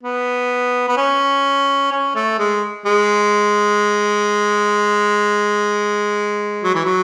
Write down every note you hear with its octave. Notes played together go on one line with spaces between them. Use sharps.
B3
B3
C#4
C#4
A3
G#3
G#3
F#3
E3
F#3